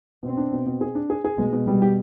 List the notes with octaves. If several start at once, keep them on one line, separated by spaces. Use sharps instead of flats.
B2 C4
D4
B2
B2
G#4
D4
G#4
G#4
B2 G#3
B2
B2 G3
G4